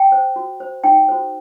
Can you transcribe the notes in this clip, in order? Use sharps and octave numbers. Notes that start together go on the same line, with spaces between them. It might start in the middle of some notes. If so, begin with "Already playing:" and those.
Already playing: G5
C5
F#4
C5
D#4 G5
F#4 A4 C5